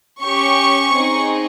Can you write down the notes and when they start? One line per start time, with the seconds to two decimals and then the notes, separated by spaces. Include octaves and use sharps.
0.22 C#4 G4 C#6
0.94 C4 D#4 G#4